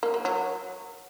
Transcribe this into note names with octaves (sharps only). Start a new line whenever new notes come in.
A#3
F#3
F#3